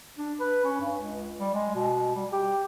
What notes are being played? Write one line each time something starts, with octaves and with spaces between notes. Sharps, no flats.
D4
B4
C#4
G2
C#2
G3
G#3
B2
G3
G4